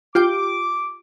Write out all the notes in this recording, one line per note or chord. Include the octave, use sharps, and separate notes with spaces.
F4 G4 G5 D6